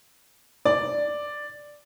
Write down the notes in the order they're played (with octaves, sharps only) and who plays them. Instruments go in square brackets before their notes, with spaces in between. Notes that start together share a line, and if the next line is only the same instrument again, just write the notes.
[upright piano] D5